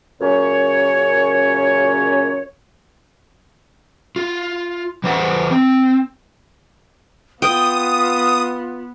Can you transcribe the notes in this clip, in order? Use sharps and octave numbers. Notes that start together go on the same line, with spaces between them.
F#2 A#2 C#3 C#4 C#5
F4
E3 B4 C5 D#5 F#5
C4
B3 F4 G5 D#6